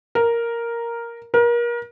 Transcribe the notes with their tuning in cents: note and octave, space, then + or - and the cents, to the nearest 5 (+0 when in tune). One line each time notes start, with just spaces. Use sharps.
A#4 +0
A#4 +30